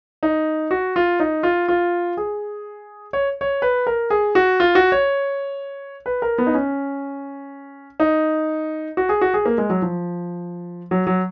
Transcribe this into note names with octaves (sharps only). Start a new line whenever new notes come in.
D#4
F#4
F4
D#4
F4
F4
G#4
C#5
C#5
B4
A#4
G#4
F#4
F4
F#4
C#5
B4
A#4
B3
D#4
C#4
D#4
F#4
G#4
F#4
G#4
A#3
G#3
F#3
F3
F#3
F#3